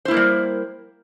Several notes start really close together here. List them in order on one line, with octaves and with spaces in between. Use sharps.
C5 E4 A#3 A#4 G3